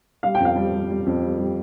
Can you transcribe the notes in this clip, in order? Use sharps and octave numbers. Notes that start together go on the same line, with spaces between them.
G3 F5
G5
F2 F5
G3
G3
G3
F2
G3
G3